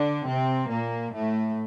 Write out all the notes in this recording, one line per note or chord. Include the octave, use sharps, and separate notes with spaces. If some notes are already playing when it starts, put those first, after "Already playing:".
Already playing: D3 D4
C3 C4
A#2 A#3
A2 A3